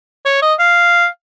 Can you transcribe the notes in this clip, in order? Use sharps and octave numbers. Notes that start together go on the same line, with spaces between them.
C#5
D#5
F5